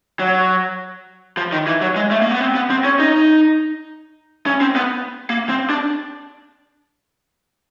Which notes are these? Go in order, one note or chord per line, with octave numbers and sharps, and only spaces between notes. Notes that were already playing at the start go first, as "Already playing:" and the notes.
F#3
F3
D#3
E3
F#3
G#3
A3
A#3
B3
C4
B3
C4
C#4
D#4
C#4
C4
B3
A#3
C4
D4